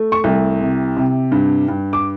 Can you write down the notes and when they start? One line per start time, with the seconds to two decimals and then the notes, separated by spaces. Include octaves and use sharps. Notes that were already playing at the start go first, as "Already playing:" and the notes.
Already playing: A3
0.12 C#6
0.24 C2
0.61 C3
0.97 C3
1.32 G2
1.68 G2
1.93 D6